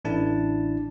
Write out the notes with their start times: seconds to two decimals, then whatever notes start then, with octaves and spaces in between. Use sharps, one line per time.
0.05 A1 D4 E4 A5